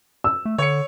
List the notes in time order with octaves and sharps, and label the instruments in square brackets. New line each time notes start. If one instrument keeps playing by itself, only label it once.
[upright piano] E6
[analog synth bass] A3
[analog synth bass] D3 [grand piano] C#5 C#7